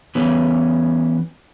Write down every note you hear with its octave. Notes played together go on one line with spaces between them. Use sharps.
E3 B3 C#4